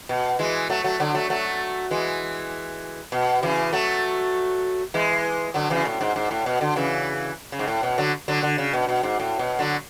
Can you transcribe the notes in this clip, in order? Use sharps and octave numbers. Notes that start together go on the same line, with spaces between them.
B2
E3 G#3
F#3 A3
F#3 A3
D3 F#3
F#3 A3
F#3 A3
E3 G#3
B2
C#3 E3
F#3 A3
E3 G#3
D3 F#3
C#3 E3
A2
G#2
G#2
A2
B2
D3
C#3 E3
C#3
G#2
A2
B2
D3 F#3
D3 F#3
D3
C#3
B2
B2
G#2
A2
B2
D3 F#3